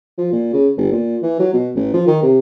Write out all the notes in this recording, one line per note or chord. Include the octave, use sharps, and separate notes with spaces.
F3
A#2
C#3
G1
A#2
E3
F#3
B2
A1
F3
D#3
C3